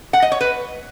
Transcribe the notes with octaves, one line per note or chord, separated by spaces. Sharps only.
F#5
D#5
C#5
B4